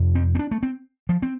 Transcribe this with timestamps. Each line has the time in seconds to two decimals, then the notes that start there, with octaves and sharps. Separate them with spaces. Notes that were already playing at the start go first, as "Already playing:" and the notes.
Already playing: F2 C3
0.15 C4
0.35 C4
0.39 D4
0.51 A3
0.63 C4
1.09 F3
1.22 C4